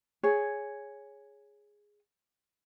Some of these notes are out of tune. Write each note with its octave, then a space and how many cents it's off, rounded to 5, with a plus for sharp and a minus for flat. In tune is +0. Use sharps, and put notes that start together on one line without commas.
G#4 +0 C#5 +0